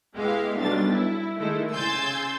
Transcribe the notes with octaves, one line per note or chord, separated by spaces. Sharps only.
G#3 B3 E4 G4 F5
B1 G3 D4 A6
E4
D#3 G#3 A3 E4
C#3 G#5 C6 E6 G6 A6